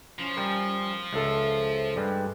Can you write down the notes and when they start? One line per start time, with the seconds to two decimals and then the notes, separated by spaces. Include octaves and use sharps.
0.19 F3 C#4
0.37 G3 A#4
1.13 C#2 A4 E5 F6
1.96 G2 G3 G#3 B4